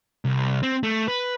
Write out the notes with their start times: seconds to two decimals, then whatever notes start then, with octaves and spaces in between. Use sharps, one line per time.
0.25 C2
0.63 C4
0.83 A3
1.08 B4